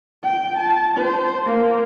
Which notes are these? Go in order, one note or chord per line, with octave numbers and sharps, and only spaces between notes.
G5
A5
C5
A#3